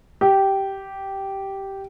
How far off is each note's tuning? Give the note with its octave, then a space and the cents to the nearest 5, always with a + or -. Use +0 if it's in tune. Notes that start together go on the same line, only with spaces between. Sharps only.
G4 -10